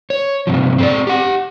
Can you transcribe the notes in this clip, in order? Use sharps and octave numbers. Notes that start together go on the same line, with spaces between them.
C#5
G2 C3 F3
C4 A4 D5
G4 F#5